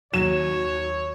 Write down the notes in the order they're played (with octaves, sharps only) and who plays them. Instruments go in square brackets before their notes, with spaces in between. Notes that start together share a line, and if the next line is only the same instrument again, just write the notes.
[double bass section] D#2 [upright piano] F#3 E7 [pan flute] F#4 [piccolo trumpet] C#5